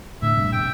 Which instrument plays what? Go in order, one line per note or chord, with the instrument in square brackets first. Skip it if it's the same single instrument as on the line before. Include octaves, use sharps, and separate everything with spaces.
[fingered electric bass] A2 D3 [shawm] E5
[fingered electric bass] G2 C3
[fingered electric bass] C3 [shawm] G5